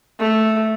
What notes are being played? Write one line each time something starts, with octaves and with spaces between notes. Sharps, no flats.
A3